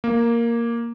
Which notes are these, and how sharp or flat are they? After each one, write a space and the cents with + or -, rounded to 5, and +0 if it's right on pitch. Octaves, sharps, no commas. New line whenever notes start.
A#3 +0